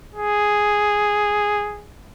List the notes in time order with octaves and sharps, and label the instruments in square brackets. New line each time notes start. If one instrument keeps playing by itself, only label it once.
[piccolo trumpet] G#4